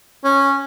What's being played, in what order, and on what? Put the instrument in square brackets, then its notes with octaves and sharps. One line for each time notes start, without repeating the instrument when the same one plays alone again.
[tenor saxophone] C#4